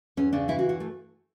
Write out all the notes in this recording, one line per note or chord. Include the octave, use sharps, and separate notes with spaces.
E2 C#4
C#3 D4
E3 E4
F#4
E2
F#4
A3